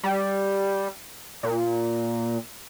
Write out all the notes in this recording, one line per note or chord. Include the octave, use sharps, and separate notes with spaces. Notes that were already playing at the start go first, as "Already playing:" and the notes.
G3
A#2